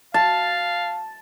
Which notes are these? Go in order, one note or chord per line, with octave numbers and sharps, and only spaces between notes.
F5 A5